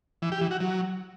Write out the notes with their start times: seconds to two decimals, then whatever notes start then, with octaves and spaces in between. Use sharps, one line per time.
0.22 E3
0.32 G4
0.41 E3
0.51 F#4
0.60 F#3